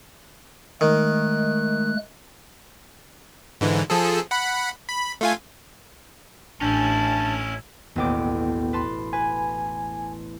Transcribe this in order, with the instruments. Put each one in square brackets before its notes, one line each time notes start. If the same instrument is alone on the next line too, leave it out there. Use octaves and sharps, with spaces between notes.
[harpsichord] D#3 [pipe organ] G#3 A3 F#6
[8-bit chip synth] G#2 D3 E3
F3 G#4 A4
F#5 B5
B5
A3 F4 G#5
[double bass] A1 [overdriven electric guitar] C#4 E4 [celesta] D4 G#5 G6 [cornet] A5
[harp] E1 A1 D6 [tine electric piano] D#2 B3 G5
[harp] B4 A5 C6
[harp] B4 [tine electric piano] G#5